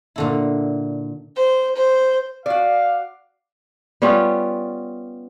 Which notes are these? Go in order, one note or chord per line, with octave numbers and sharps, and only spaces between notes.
A#2 D3 E4
C5
C5
F#4 D5 F5
G3 B3 C#4 F4